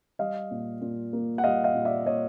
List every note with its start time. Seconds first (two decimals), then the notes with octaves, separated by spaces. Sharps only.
0.19 G3 D#5 F5
0.51 A#2
0.81 A#2
1.13 A#3
1.38 F#5
1.44 G3 D#5 F5
1.64 D#5 F5
1.74 A#2
1.85 D5 E5
2.06 A#2 C#5 D#5